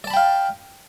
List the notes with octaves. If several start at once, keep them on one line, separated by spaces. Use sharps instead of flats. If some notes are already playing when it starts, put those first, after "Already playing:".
D5 F5 G5 A5 B5